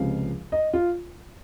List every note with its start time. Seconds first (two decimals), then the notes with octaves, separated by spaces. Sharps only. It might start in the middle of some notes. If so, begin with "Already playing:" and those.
Already playing: C#2 C3 F3 G#3 F5
0.52 D#5
0.73 F4